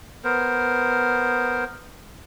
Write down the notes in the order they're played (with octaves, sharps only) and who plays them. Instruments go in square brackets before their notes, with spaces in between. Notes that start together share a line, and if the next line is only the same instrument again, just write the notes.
[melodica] B3 A#4 C5